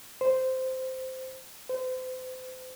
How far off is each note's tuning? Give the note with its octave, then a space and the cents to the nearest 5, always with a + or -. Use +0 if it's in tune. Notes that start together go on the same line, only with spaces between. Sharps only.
C5 -10
C5 -35